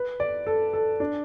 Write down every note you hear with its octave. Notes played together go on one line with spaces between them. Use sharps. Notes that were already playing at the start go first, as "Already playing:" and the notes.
Already playing: B4
D5
A4
A4
D4